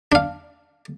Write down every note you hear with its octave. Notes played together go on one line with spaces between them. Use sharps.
D4 F5